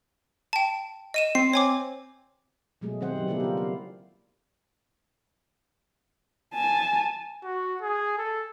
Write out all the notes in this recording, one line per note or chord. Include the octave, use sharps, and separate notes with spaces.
G5 A5
D#5 D#7 E7
C4 C7
C#5 G#5 D6
B2 F#3 G#3 A3 G#4
D#3 G3 C4 C5 F#5
C#3 F#3 G3
G3 A#3 B3 E4 G4 A4
F4 A#4
F5
G#5 A5
F#4
G#4
A4